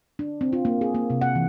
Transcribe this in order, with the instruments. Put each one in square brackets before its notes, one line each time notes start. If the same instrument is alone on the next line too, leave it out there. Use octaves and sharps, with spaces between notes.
[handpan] D4
C4
F4
A#3
G#4
A#3
C3
F#5
E3